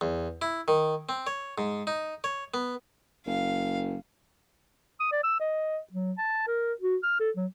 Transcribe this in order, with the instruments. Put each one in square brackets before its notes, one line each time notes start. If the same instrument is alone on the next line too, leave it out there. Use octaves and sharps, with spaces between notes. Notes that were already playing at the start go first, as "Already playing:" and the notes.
[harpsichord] E2
E4
D#3
C4
C#5
G#2
D#4
C#5
B3
[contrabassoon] F#1 [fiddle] F5
[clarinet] D#6
D5
E6
D#5
F#3
A5
A#4
F#4
F6
A4
F#3